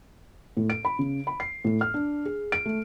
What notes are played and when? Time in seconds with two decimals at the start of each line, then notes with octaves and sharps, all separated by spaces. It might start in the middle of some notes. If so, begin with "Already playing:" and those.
0.57 A2
0.70 D7
0.85 B5
0.99 C#3
1.27 B5
1.40 C7
1.64 A2
1.81 F6
1.94 D4
2.25 G#4
2.52 D7
2.66 A3